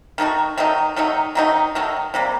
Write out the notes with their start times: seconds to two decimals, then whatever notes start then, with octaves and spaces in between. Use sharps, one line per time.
0.18 D#3 A3 D#4 F#4
0.58 D#3 F#3 A3 D#4
0.96 D#3 F#3 A3 D#4
1.35 D#3 F#3 A3 D#4
1.75 D#3 F#3 A3 D#4
2.14 C3 G3 A#3